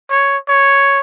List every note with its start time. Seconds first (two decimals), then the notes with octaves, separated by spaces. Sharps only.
0.11 C#5
0.49 C#5